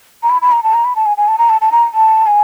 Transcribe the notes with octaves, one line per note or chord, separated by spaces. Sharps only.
A#5
B5
B5
A#5
A5
A#5
B5
A5
G#5
G#5
A5
A#5
A5
A5
A#5
A5
G#5